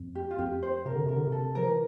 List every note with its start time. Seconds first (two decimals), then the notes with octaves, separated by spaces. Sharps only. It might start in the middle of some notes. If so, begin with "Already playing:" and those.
Already playing: F2
0.15 G4
0.31 F4
0.38 F2 G4
0.63 C5
0.85 C3 A#4
0.96 D3
1.06 C3 A#4
1.17 D3
1.27 C3
1.32 A4
1.55 F3 A#4
1.68 E3